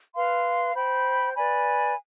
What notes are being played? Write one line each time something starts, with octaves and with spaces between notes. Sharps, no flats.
B4 F5 C6
C5 G5 B5
B4 D5 G#5 B5